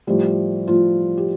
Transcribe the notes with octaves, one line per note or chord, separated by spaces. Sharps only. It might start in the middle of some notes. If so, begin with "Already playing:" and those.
A2 F3 G3 G4
A2 F3 F4
G4